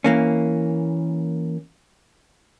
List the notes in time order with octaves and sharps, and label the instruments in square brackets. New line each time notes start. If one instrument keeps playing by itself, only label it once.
[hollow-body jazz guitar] E3 A#3 C#4